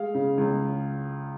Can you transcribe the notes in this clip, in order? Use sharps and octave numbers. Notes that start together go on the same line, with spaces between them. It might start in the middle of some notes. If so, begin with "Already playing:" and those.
Already playing: G#3 F5
C#3
C#2